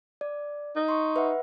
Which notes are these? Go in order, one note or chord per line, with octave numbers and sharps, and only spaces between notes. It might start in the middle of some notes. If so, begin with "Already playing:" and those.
D5
D#4
C6 C#6
B4 E5 F#5